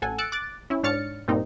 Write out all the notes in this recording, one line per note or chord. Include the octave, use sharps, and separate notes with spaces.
A1 A4 F#5 G#5
E6 F#6 A6 C#7 D7
D6 F#6 A6
C#4 E4
G#2 D4 C#5 F6 A6 C#7
G2 A#2 G3 A#3 C4 D#4